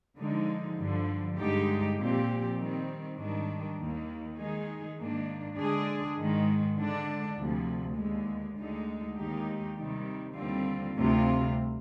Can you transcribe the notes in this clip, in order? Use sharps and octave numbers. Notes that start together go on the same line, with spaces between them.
D3 F3 G#3 D#4
G2 D3 F3
G2 D3 G#3 D#4 G4
A#2 F3 C4 G4
D#3 G3 C4
G#2 D#3 G3 D4
D#2 D#3 A#3
D#3 G#3 D#4 G#4
G#2 D#3 A#3 D4
D3 G#3 D4 G#4
G#2 D#3 G#3
D3 G#3 D4
D2 C3 F3
D#2 D3 G#3
D2 D3 G#3 D#4
D#2 D#3 G#3 D#4 G4
C3 D#3 G3
D#2 D3 G3 C4 F4
D2 C3 G3 C4 F4